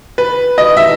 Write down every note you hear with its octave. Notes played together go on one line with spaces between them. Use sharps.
B4
D#5
E5